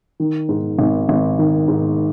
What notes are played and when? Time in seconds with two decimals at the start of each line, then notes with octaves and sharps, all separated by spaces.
0.20 D#3
0.49 G#2
0.79 G#1
1.09 G#1
1.39 D#3
1.68 G#2